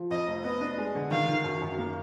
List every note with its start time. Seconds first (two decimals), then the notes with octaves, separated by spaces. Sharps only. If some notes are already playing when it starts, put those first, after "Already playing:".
Already playing: F3
0.10 F2 D#5
0.27 F1
0.44 B3 D#5
0.61 D4
0.78 G#3
0.95 D3
1.11 D#3 F5
1.27 D#3
1.44 F#2
1.62 F#2
1.78 A#3